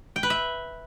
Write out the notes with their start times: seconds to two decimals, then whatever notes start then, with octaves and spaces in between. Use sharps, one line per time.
0.16 G5
0.23 B4
0.30 E5